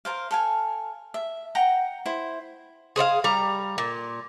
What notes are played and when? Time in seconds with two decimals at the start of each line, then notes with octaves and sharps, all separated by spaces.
0.05 A#4 C5 F5
0.31 A4 F5 G#5
1.14 E5
1.55 F#5 G5 A#5
2.06 E4 C5
2.96 G#4 C5 D5 F5
3.24 G3 A#5
3.78 A#2